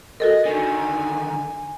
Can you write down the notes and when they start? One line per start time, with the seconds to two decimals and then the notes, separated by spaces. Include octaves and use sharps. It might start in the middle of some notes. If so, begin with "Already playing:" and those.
0.20 F#4 A4 A#4 D#5
0.45 D3 D#3 G#5